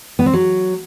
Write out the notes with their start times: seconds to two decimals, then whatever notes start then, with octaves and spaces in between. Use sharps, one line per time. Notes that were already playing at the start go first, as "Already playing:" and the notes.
0.19 B3
0.26 C4
0.33 F#3